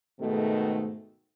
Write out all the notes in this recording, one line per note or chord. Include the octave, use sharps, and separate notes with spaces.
G#2 B2 D#3 G#3 A3